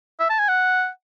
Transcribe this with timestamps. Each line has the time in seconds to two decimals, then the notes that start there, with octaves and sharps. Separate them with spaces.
0.19 E5
0.30 A5
0.39 G#5
0.48 F#5